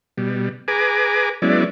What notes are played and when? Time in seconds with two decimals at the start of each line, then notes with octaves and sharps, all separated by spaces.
0.18 B2 G3
0.68 G#4 B4 G#5 A#5 D6
1.42 F#3 G#3 B3 C#4 E4 D5